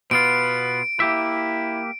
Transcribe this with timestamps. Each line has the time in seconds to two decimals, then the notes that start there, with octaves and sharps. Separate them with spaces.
0.11 B2 B3 F4 B4 D7
1.00 A#3 E4 G4 E5